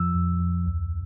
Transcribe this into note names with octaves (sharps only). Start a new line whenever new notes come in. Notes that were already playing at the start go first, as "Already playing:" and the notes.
Already playing: F2 F3 E6
F2
F2
D2